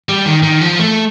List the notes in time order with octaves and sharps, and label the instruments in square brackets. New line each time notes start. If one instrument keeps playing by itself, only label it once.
[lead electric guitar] G3
D#3
D#3
F3
A3